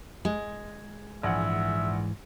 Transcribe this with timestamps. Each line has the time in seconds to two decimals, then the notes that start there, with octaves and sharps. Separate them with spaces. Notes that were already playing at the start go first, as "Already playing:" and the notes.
0.25 G#3
1.23 A#1 G#2 E3 E5 F#5 G#5